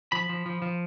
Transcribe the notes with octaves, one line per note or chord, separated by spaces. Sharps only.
F3 B5
F3
F3
F3